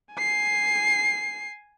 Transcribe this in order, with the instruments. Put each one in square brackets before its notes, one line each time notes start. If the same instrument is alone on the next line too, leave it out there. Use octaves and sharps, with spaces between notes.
[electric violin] G#5 C7